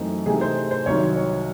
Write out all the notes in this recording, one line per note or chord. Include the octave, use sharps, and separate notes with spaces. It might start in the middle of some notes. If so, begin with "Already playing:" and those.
Already playing: F#2 E3 A3 C4 D#4
C3 E3 A3 C4 D#4 G#4
C5
C5
C2 C3 D#3 F#3 C#5
C#5